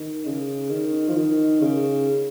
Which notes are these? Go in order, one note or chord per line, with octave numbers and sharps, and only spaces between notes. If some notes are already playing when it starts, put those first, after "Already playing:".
Already playing: D#3
C#3
D#3
F3
D#3
C#3